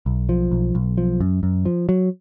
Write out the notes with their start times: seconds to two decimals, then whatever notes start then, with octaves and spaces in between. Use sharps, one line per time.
0.06 B1
0.29 F3
0.51 B1
0.75 B1
0.98 F3
1.21 F#2
1.43 F#2
1.65 F3
1.89 F#3